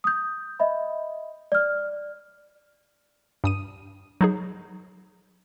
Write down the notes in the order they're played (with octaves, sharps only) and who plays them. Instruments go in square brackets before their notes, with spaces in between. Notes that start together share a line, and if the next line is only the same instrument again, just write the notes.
[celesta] D#6 G6
D#5 E5 B5
D5 F6
[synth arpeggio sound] G2 D#6 D#7
F#3 D#4 G#4